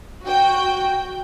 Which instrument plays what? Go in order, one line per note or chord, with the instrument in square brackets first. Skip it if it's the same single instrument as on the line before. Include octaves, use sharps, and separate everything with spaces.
[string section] F#4 G5